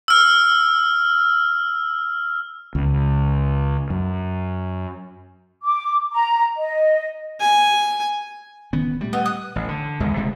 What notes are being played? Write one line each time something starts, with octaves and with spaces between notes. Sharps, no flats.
E6 F6
C#2
F#2
D6
A#5
D#5
G#5
D1 D#3 B3 C#4
A#2 G3 A3
B3 C4 D#5
D#6 F#6
A1
D3
A1 D#2 G#2 G#3
D#1 C3 G#3 A3